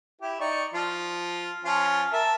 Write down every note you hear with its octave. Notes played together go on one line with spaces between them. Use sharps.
E4 G4
D#4 D5 C#6
F3 F4
F3 C#4 F4
A#4 E5 A5